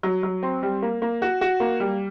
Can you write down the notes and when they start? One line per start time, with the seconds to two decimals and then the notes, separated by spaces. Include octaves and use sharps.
0.03 F#3
0.23 F#3
0.43 C4
0.63 G3
0.82 A#3
1.02 A#3
1.22 F#4
1.41 F#4
1.60 A#3
1.80 G3